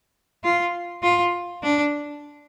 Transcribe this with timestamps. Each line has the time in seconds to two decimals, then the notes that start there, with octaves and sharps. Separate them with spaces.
0.44 F4
1.03 F4
1.62 D4